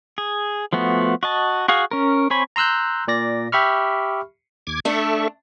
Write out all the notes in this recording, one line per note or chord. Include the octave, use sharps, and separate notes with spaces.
G#4
F3 A3 B3 F#4
F#4 D#5 A5
F#4 G#4 F5
C#4 A#4
C4 C5 C#5 G#5 B5
A#5 C6 E6 F#6 G6
A#2 D5 A#6
G4 E5 B5 C#6 F6
D#2 D6 G#6
A3 D4 A4 E5 C#6